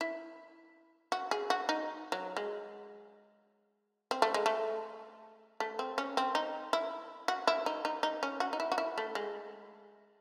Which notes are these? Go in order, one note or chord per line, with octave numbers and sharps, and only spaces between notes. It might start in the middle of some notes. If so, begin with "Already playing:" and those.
E4
F#4
G#4
F#4
D#4
F#3
G#3
C4
A3
G#3
A3
A3
C4
C#4
C4
D#4
E4
F#4
E4
D#4
D#4
D#4
C#4
F#4
D#4
E4
F#4
E4
A3
G#3